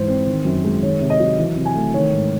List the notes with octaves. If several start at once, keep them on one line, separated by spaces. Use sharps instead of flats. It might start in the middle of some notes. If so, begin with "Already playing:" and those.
Already playing: G#2 E3 C5
C4
D#3
F#2
G#3
D#3 C#5
C3
D#5
F#3
E3
C3
G#5
A3
D#3 C#5
G#2